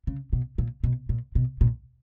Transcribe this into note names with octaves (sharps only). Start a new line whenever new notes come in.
C#3
B2
A#2
B2
A#2
B2
A#2